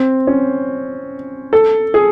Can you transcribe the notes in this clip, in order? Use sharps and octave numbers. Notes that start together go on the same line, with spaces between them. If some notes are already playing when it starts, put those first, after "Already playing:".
Already playing: C4
C#4
A4
G#4